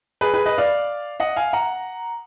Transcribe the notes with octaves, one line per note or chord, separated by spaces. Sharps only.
G#4 B4
G#4 B4
B4 D#5
D5 F5
D#5 F#5
F5 G#5
F#5 A#5